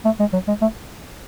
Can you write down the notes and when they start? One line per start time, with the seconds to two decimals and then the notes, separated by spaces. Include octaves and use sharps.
0.05 A3
0.20 G#3
0.33 F#3
0.48 G#3
0.62 A3